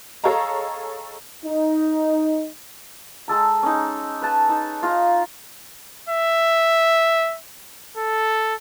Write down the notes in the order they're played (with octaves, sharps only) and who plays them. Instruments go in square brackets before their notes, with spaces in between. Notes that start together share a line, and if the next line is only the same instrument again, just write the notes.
[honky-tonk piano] G#4 A4 C#5 D#5 F5 A#5
[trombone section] D#4
[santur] G#3 A4 A#5
C#4 D#4
B4 A5
D#4
F4 F5 A#5
[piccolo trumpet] E5
A4